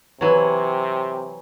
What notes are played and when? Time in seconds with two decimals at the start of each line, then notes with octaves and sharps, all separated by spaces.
0.21 C3 E3 F#3